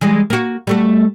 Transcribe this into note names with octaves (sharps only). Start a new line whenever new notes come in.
E3 G3 G#3
A#3 F#4
G3 A3 F#4